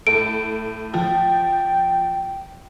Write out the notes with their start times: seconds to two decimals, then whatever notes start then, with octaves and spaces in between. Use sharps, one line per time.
0.07 A2 A4 D7
0.94 F3 G5